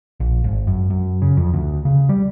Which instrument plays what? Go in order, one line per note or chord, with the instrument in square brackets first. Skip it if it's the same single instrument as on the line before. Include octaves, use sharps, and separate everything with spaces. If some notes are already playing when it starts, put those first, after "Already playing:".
[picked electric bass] A#1
G#1
F#2
F#2
C#3
F2
D2
C#3
G3